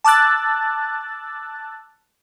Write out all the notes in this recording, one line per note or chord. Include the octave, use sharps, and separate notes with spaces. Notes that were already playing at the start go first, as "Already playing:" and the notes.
A5 D6 E6 F#6 A6